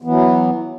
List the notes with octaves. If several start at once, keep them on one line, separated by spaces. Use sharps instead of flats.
E3 F#3 B3